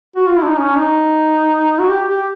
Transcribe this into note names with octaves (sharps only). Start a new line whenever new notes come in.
F#4
F4
E4
D4
D#4
C#4
D#4
F#4
G4
G4